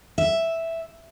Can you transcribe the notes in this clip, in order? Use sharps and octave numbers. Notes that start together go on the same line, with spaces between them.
E5